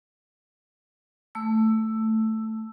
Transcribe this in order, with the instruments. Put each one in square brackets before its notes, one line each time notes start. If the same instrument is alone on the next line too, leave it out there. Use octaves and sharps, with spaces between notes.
[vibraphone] A3 E6